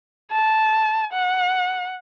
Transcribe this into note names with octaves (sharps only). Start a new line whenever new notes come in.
A5
F#5